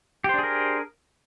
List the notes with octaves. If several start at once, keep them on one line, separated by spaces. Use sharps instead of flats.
D4 G4 G#4 A#4 C5